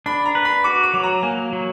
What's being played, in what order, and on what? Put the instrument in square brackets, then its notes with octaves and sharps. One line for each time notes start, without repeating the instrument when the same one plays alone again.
[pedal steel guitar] D4 [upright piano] B5
[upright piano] A#5
[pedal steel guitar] B4
[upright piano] B5
[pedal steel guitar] F#4 [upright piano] D6
[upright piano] D6
[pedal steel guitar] F#3
[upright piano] A#5
[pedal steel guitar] A#3 [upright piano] G#5
[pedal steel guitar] F#3